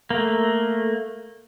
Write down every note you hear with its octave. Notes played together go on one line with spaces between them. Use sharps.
A3 A#3